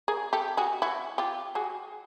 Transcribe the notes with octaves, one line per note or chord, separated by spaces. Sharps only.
G#4 A#4
G4 A4
F#4 G#4
E4 F#4
F4 G4
F#4 G#4